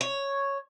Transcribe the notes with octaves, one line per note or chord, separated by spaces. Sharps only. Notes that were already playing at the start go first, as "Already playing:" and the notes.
C#5